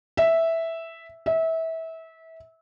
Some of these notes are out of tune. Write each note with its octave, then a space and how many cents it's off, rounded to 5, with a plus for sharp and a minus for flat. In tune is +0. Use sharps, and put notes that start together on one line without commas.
E5 -5
E5 -25